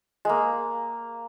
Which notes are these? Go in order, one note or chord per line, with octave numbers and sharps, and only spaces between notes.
G#3 A#3